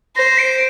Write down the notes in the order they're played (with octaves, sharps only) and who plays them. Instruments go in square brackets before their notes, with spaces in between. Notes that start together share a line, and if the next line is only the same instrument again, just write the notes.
[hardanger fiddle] C5 [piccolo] A#6
[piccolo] D7